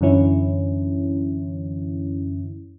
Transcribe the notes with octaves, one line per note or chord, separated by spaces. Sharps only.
F#2 D3 E3 C#4 E4